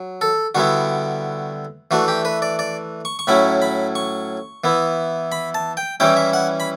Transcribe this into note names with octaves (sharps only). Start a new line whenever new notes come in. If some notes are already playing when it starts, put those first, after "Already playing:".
Already playing: F#3
A4
D3 G3 B3 E4 F#4
E3 A3 D4 F#4
G4
B4
D5
D5
C#6
C#6
A2 F#3 C#4 E4 B5
B5
C#6
E3 B3 E4
B5
A5
G5
E3 G3 C#4 E4 G5
E5
F#5
B5